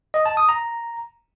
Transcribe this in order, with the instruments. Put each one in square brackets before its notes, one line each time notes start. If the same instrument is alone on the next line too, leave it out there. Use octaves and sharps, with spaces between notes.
[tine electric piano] D#5
A5
D#6
A#5